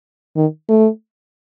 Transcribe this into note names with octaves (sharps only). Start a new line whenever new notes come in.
D#3
A3